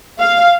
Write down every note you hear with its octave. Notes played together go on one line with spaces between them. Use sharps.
F5